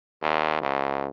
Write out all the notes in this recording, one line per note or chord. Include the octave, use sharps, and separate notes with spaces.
D#2
C#2